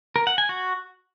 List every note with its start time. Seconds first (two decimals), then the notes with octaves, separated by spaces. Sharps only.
0.16 A#4
0.27 F#5
0.38 G#5
0.49 F#4